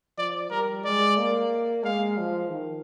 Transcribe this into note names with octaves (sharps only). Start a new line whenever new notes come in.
F3 D5
G3 A#4
G#3 D5
A#3
G#3 F5
F3
D#3